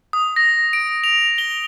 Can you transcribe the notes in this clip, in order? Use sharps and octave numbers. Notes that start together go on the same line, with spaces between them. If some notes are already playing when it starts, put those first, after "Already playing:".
D#6
A#6
D7
F7
G7